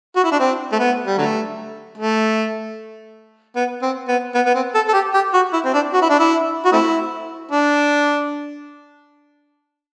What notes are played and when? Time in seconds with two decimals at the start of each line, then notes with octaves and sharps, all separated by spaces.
0.16 F#4
0.24 E4
0.32 D4
0.39 C4
0.72 A3
0.79 B3
1.07 G3
1.18 D3 F#3 A3
1.97 A3
3.56 B3
3.83 C4
4.08 B3
4.35 B3
4.46 B3
4.55 C4
4.75 A4
4.88 A4
4.94 G4
5.14 G4
5.34 F#4
5.53 E4
5.65 C4
5.74 D4
5.93 F#4
6.02 E4
6.10 D4
6.19 E4
6.65 F#4
6.72 A3 C4 E4
7.51 D4